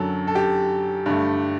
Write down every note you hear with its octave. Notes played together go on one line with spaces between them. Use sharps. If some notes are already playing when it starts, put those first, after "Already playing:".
Already playing: F#2 D3 F#3 A4
A4
G4
G2 D3 A3